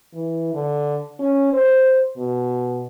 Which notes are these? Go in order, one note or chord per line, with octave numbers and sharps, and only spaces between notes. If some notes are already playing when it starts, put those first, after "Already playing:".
E3
D3
C#4
C5
B2